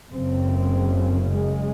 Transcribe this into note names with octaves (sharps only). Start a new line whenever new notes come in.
F#1 F#2 C#3 C4
G#3